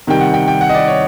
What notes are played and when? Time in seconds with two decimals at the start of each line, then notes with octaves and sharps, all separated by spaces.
0.07 C3 D#3 G3 G5
0.20 F#5
0.34 G5
0.48 G5
0.61 F#5
0.69 D#5
0.75 D5
0.88 C#5